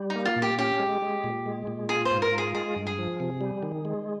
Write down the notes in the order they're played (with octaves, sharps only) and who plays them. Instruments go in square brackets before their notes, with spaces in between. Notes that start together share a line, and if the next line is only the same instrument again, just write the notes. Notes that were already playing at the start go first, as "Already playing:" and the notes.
Already playing: [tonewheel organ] G3
[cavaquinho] D#4
[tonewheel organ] A#3
[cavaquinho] F4
[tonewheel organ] A#2
[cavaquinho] G4
[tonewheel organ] C#4 [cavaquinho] G4
[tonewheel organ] G#3
G#3
A#2
G#3
A#2
[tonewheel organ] F4 [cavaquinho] G#4
[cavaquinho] C5
[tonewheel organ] G#2
[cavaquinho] A#4
[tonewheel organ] F4
[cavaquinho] G#4
[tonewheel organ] G#3 [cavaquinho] G#4
[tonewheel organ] G2
[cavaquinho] G#4
[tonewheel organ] F3
C3
G3
D#3
G#3